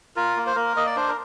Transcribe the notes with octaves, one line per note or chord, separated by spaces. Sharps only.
F4 A#4
A#3
C5
A#3 A#4
A#3 D#5
D5
D4 C5
A#4